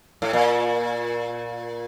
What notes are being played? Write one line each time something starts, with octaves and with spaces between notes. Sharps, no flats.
A2
A#2